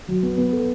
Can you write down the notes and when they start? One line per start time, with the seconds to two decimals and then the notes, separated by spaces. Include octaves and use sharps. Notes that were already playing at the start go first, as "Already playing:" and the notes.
0.08 F#3
0.23 B3
0.38 B3
0.53 A4